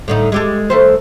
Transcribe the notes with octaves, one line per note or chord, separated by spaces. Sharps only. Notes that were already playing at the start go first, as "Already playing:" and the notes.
A2 D3 D#4
G#3 G4 A4
D#3 A3 C5